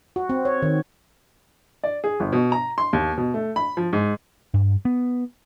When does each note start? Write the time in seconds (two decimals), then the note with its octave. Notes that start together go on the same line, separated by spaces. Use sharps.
0.16 F#4
0.30 C4
0.45 C#5
0.62 D#3
1.83 D5
2.04 G#4
2.20 G1
2.32 B2
2.52 A#5
2.78 C6
2.93 D#2
3.18 B2
3.34 A3
3.56 B5
3.77 F3
3.93 G#2
4.54 G2
4.85 B3